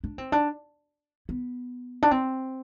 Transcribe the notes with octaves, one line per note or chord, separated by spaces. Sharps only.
D4
C4
D4
B3
D4
C4